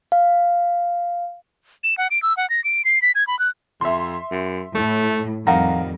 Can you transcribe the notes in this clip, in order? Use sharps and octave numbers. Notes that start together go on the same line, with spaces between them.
F5
E7
F#5
D7
E6
F#5
A#6
D7
C7
B6
G#6
B5
F#6
F2 E5 C6
F#2
A2 A3
F2 D#3 G3 F5 F#5 A#5 A#6